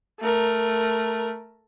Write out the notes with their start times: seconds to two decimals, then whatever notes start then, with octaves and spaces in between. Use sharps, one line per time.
0.21 A3 A#4